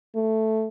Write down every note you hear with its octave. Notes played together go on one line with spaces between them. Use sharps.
A3